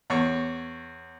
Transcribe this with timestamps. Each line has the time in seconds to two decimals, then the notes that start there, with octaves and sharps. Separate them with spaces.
0.10 E2 C#5 C#6